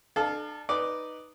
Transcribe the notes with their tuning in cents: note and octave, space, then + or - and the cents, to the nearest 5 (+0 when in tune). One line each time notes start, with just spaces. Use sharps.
D4 +35 A4 -25 F5 +0
D#4 -5 B4 +0 D5 -5